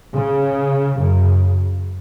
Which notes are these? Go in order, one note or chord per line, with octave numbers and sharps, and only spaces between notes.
C#3
F#2 C#3